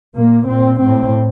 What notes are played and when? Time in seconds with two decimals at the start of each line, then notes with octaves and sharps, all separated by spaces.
0.16 A#2 A#3
0.48 A#2 C4
0.81 A2 C4